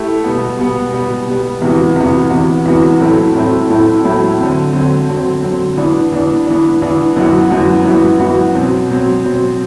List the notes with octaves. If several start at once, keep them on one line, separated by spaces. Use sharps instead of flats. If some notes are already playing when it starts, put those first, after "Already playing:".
Already playing: A3 E4 G4
B2 G3 B3
B2 G3 B3
B2 G3 B3
B2 G3 B3
E2 C3 E3 B3 F#4
E2 C3 E3 B3 F#4
E2 C3 E3 B3 F#4
E2 C3 E3 B3 F#4
A2 F#3 A3 C4 E4
A2 F#3 A3 C4 E4
A2 F#3 A3 C4 E4
A2 F#3 A3 C4 E4
D3 F#3 C4
D3 F#3 C4
D3 F#3 C4
D3 F#3 C4
E3 B3 D4
E3 B3 D4
E3 B3 D4
E3 B3 D4
F#2 E3 B3 F#4
F#2 E3 B3 F#4
F#2 E3 B3 F#4
F#2 E3 B3 F#4
B2 F#3 C4
B2 F#3 C4
B2 F#3 C4